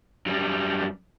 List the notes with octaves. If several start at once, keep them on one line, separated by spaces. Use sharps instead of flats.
F#2 G3